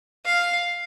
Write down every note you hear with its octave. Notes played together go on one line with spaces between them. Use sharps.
F5